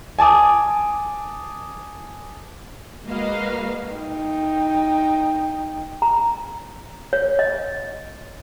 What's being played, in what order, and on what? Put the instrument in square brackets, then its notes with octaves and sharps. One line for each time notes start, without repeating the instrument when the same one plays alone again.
[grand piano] G#5 A5 D6 D#6
[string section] G#3 A#3 F#4 B4 D#5 F5
[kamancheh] D#4 G5
[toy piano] A#5
C#5
D#5